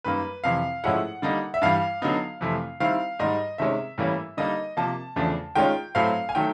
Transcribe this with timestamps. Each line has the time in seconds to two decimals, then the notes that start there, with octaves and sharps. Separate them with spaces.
0.04 F#2 D#3 G3 A#3 B4
0.44 F2 C3 E3 F5
0.84 A2 F3 G#3 C#4 E4 F#5
1.22 D3 G3 A#3 D#4
1.54 E5
1.62 G2 E3 G3 F5
2.02 D3 F#3 B3 D#4
2.41 F2 C3 E3 A3
2.80 D#3 G3 C4 E4 F5
3.19 G#2 D#3 G3 D#5
3.58 C3 D#3 G#3 C#4 E5
3.98 A2 E3 G3 A#3 C#4
4.37 D3 G3 A#3 D#4 D#5
4.77 C3 F3 A#3 A5
5.16 E2 C#3 F3 A3 D4
5.55 D#3 G#3 C#4 F4 G5
5.95 A2 F#3 A3 C4 F5
6.29 G#5
6.35 D#3 F#3 A3 G5